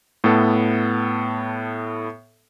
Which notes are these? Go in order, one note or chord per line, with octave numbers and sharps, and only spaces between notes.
A2 B3 A4